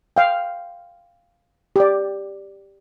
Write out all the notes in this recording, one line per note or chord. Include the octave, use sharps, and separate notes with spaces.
F5 G5
G4 D5